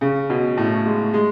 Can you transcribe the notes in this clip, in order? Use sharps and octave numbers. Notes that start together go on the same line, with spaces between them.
C#3
B2
A2
G#3
G#3